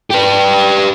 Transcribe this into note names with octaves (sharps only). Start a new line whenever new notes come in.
G4 B4